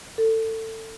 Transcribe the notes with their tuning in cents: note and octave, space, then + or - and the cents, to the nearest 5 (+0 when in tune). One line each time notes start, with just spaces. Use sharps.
A4 +20